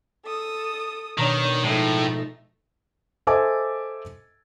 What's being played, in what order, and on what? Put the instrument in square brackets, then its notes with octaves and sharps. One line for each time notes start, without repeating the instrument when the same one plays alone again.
[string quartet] A4 D#6
[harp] B2 A#5 [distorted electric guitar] D#3 [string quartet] D4 C#5
[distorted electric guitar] A2 [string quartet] F3 A3 D#4 [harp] G#3
[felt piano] A4 C5 D#5 E5 G#5 D6